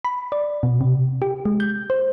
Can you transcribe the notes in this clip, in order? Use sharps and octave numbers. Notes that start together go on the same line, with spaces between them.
B5
D5
B2
C3
G4
G#3
G6
C5